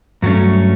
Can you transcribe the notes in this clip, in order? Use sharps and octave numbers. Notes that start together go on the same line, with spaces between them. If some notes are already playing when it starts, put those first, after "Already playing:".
G2 F#3 A3 C#4